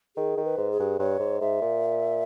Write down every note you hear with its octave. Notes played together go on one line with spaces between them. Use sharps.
D#3 G#4
D#3
B4
G#2
G#4
G2
G2 C#5
G#2
G#2 E5
A#2